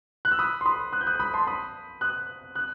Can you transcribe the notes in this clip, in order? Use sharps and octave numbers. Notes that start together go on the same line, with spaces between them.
F#6
E6
B5 D#6
C6
B5 D#6
D#6 F#6
G6
D#6 F#6
B5 D#6
A5 C6
B5 D#6
D#6 F#6
D#6 F#6